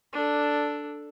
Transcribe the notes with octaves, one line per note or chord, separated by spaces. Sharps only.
D4 A4